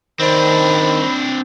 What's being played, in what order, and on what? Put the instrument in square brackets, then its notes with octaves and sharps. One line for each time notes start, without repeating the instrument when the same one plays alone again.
[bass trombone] D#3 [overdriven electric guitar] C4 D4 [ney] C5 [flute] B5